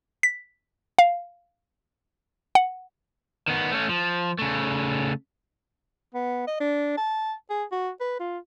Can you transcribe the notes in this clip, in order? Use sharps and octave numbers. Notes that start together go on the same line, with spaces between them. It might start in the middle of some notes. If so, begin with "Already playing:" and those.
B6
F5
F#5
D#3 B3
A3 C#4
F3
C#3 A3
B3
D#5
D4
A5
G#4
F#4
B4
F4